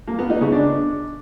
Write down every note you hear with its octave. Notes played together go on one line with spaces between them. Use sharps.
A#3
B3
D#4
C#3
D4